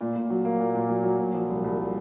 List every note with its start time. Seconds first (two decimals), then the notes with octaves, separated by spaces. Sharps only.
0.01 A#2
0.16 A#2
0.30 F#3
0.45 A#3
0.60 A#2
0.75 A#2
0.89 F#3
1.04 F#3
1.19 A#2
1.34 F3
1.49 C2
1.64 C2